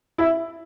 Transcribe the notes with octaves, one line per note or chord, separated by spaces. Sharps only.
E4